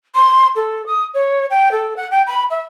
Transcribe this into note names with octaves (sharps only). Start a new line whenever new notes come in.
C6
A4
D#6
C#5
G5
A4
F#5
G5
B5
E5